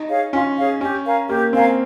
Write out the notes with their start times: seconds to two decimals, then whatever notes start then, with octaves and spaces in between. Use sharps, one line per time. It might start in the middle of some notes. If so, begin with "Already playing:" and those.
Already playing: D#4
0.08 G#4 C#5 F5
0.33 C#4 F4
0.57 G#4 C#5 F5
0.80 C#4 G4
1.05 A#4 F5 G#5
1.29 A#3 G4
1.53 C4 A#4 F5 G#5